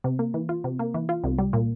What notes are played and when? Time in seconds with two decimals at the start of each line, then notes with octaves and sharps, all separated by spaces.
0.04 C3
0.19 A#3
0.34 E3
0.49 F4
0.64 C3
0.79 A#3
0.94 E3
1.09 F4
1.24 C2
1.39 G3
1.53 A#2